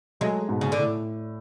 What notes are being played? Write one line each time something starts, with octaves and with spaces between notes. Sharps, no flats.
F#3 G#3 A3
G#2 B2
C#3
D3
A2